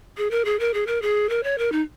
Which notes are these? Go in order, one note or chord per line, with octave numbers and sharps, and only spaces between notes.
G#4
A#4
G#4
A#4
G#4
A#4
G#4
A#4
C#5
A#4
D#4